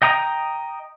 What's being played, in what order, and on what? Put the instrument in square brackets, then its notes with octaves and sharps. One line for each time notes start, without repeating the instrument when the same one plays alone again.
[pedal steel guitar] D#5 G5 A#5 D#6